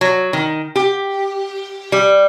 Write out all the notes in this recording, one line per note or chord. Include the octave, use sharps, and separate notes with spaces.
F#3
D#3
G4
G3